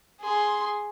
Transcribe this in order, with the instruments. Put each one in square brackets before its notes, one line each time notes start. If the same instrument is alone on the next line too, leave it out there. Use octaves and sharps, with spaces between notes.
[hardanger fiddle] G#4 C6